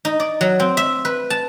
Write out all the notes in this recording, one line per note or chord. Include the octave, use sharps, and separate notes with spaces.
D#4
D5
F#3
C4
E5
B4
A5